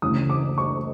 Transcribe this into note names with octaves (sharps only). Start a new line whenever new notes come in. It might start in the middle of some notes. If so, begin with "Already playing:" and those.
D2 C#3 E3 D#6
D6
C#6